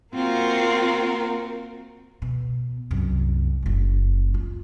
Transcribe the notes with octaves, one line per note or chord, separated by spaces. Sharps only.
A#3 C4 F4 F#4 A#4
B2
C2 F#2
F#1 G3
F4